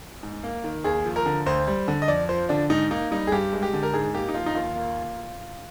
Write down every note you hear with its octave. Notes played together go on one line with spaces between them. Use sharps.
G#2
A#3
D#3
D#2 G#4
F3
A#4
D3
D2 C5
G3
D3
D#5
F2 D5
F3 C5
D3 D4
G#2 D#4
A#3 D#4
G3 D#4
G#4
G2 G4
G#3
G4
D3
A#4
G#2 G#4
A#3 G4
D#4
F3 F4
D#4
D#2 F4
A#3